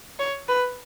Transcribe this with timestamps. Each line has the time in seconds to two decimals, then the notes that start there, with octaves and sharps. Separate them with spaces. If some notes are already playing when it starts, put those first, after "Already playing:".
0.19 C#5
0.48 B4